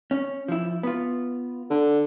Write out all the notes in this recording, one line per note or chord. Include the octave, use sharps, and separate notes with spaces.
C#4
F3 E4
B3 F4
D3